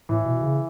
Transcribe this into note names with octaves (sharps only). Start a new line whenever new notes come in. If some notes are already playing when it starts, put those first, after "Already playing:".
A2 E3
B2
C#3